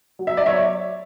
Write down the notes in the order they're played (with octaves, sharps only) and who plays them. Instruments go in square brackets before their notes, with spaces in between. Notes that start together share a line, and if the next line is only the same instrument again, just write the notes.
[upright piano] F#3
E5
F#3 D5
C#5 E5